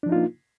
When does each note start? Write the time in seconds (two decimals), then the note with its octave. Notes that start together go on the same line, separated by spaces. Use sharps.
0.03 D4
0.06 F3
0.09 D#4
0.12 F4
0.15 A#3